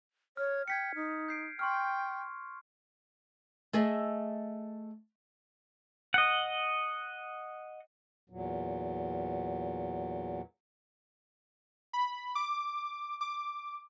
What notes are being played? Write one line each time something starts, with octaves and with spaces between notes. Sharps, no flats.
C#5 F6
G5 G#6 B6 C#7
D#4
G6 C7 D7
G5 C6 C#6 F6
A3 G#4 D#5 E5
D#5 F#5
E2 A#2 F#3
B5
D6
D6